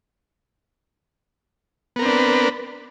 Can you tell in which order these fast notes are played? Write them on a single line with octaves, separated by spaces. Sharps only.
B3 A#4 C4 D4 B4